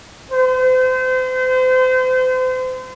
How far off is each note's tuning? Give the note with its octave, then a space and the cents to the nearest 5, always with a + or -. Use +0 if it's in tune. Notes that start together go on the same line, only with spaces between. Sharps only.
C5 -35